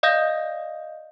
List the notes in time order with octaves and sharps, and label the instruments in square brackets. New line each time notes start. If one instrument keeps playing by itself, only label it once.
[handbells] D5 D#5 F5 D#6 G6 A#6